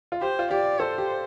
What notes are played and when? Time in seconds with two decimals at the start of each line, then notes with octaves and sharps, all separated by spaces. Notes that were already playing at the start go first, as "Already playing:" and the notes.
0.12 F4
0.21 G4 C5
0.39 F4
0.51 G4 D5
0.80 A4 C5
0.98 G4